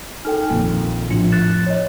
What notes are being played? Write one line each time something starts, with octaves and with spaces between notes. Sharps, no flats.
D#4 A4 G5 F6
A#1 F2 A#2 D#3 A#3
A2 F3 D4 E4 C#7
F#6 A6 E7
C#5 D#5